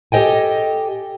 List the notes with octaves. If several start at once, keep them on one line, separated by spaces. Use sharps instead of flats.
G4 A4 C#5 D#5 G5 G#5